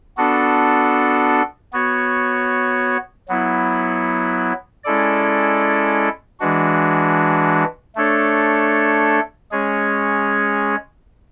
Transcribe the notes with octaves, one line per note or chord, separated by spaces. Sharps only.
B3 D4 F#4 A4
B3 F#4 C#5
F#3 B3 E4
G#3 C#4 E4 A4 D5
E3 G#3 D4 F#4
A3 D4 A4 C#5
G#3 C#4 G#4 C#5